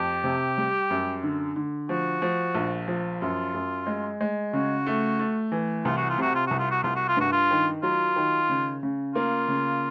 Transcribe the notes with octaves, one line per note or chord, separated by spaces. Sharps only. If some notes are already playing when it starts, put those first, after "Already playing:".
Already playing: F2 G4
C3
G3
F#2
D3
D3
F3 F#4
F3
A#1
F3
F#2 F4
F#2
G#3
G#3
C#3 F#4
A3
A3
E3
C2 F4
F#4
F4
C3 F#4
F4
C2 F#4
F4
F#4
C2 F4
F#4
F4
G2 F#4
F4
D#3
F#3 F4
D#3
C#3
C#3
A#3 F4
C#3